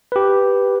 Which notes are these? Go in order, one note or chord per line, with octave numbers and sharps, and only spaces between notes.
G4 B4